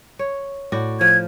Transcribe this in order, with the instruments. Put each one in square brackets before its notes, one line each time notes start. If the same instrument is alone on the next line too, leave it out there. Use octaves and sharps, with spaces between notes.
[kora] C#5
A2 F#4 D5
[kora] F3 [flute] G#6